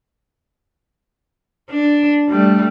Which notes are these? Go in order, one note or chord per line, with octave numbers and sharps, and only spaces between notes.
D4
G3 A3